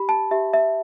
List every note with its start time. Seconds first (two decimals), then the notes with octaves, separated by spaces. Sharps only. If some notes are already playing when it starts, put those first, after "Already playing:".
Already playing: G4 B5
0.09 A5
0.31 G4 E5
0.54 E5